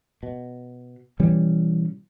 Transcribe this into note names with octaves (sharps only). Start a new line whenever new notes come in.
B2
B2 E3 G3 C#4